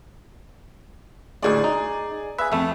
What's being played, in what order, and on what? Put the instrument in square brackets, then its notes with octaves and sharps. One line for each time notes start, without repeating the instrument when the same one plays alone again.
[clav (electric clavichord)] D2 A2 G#3 [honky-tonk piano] G#4 D5
[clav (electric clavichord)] D#4
[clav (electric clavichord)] G#4 B4 [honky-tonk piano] E5
[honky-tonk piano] F2 [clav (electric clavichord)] A3 E5